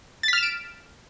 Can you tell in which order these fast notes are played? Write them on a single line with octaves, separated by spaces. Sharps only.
A6 B6 F6 E7 D7